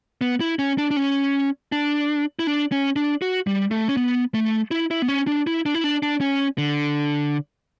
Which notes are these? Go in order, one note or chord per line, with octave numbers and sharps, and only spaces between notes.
B3
E4
C#4
D4
D4
C#4
D4
E4
D4
C#4
D4
F#4
G3
A3
C#4
B3
A3
E4
E4
B3
C#4
D4
E4
D4
E4
D4
D4
C#4
D3